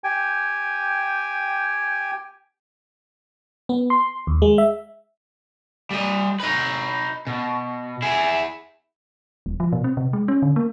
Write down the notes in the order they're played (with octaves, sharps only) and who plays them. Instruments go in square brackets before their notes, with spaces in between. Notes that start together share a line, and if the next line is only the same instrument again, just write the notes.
[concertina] G4 G5 G#5
[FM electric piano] B3
C6
D#2
G#3
E5
[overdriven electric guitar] G3 D#5
D#4 B4
B2
E4 G#4
[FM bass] E1
F3
B2
C4
C3
G#3
C#4
D3
A#3